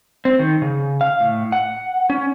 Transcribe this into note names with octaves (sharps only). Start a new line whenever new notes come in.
C4
D#3
C#3
F5
A2
F#5
C#4